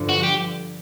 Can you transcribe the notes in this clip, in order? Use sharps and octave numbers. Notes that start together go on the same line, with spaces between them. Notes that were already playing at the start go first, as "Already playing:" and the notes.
Already playing: G2 D3 F3
F#4
G4